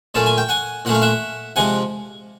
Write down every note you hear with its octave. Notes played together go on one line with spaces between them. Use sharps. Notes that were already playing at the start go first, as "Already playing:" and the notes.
A#2 F#3 A3 C#4 A5
G#5
G5
F#5 G#5
A#2 F#3 A3 C#4 F#5
F5
E5 F#5
C3 F3 G#3 F#5 G#5